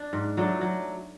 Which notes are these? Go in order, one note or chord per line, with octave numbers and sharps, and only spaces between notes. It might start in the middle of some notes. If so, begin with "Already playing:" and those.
Already playing: D4
G#2
F#3 A3 D4
F#3